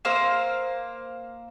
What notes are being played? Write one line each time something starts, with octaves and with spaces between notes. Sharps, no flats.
A#3 C5 F5 E6